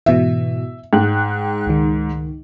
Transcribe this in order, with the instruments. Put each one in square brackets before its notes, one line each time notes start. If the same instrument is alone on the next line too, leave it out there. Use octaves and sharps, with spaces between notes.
[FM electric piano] G#2 B2 E3 [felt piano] E5
[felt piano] G#2 [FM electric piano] G5 F#6
[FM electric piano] C#2 D#3